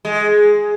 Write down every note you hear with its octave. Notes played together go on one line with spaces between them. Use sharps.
G#3